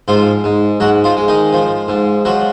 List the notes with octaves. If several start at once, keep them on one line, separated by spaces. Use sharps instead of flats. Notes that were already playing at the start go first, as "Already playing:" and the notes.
G#2 F3 F4
G#2
G#2 F#3 F#4
F3 F4
G#3
D#3 D#4
F3
G#2
F3 F#3 F#4